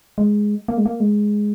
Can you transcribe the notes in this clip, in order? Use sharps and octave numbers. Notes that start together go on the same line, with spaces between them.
G#3
A#3
G#3
A#3
G#3